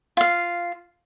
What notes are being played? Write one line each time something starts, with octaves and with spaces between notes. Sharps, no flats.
F4 F5